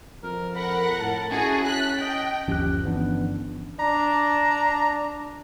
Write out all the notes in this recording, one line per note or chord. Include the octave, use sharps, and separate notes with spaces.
F2 A#4
A#4 F#5 B5
A2 A5
C#4 E4 F#4 G#4
F#6 B6
D#5 G5
G1 D#2 F3 C#4 G4 F#6
E3 B3 D4
D4 A#5